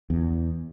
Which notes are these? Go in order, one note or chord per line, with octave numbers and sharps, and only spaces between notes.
E2